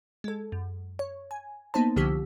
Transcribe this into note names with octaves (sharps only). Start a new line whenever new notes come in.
G#3 A4
F#2
C#5
G#5
A#3 B3 D#4 C5 A5
C2 D3 F3 G4 E6 B6